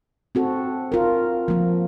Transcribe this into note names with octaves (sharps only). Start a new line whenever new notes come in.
C4 F#4 A4
F4 A#4
F3 A#3